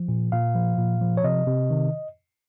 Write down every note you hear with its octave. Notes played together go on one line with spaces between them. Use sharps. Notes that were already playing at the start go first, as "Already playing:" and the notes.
Already playing: F3
A#2
A#2 F5
F3
A#2
F3
C#5
C3 D#5
C3
D#3